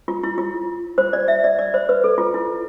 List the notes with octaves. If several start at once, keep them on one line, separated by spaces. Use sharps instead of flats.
F4
E4
F4
C5
D5
E5
D5
D5
C5
B4
A4
F4
E4